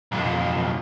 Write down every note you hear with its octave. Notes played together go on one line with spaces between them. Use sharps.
B1 F2